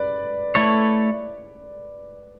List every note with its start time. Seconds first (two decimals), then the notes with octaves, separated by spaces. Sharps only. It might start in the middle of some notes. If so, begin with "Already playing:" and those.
Already playing: B4 D5
0.55 A3 E4 A4 C#5